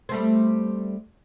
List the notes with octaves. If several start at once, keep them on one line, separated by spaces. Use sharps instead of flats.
G3 A3 C4